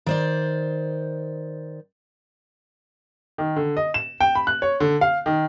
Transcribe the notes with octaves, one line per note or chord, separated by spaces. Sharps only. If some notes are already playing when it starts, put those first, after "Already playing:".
D#3 C5 D5
D#3
D3
D#5
E7
G5
B5
F#6
C#5
D3
F5
D#3